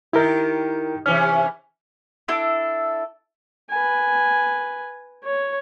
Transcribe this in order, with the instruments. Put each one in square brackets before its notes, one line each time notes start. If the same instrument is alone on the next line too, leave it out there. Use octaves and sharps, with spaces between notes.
[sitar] D#3 G4 [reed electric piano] E4 A#4
[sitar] C3 E3 C#4 [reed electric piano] F6
[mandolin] D4 E4 A4
[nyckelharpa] B4 G#5
C#5